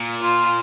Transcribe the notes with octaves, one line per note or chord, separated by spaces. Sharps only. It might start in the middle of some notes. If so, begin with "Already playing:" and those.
Already playing: A#2
F4